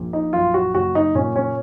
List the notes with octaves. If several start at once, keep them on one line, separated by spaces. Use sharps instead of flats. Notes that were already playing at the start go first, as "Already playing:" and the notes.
Already playing: A#1 A#2
D#4
F#2 F4
F#4
F#1 F#4
D#4
A#2 C#4
C#4